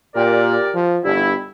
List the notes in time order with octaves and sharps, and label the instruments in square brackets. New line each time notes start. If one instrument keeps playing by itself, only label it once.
[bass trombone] A#2 [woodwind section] G4 A#4 D5
[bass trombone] F3
[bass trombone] G1 [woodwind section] G2 E4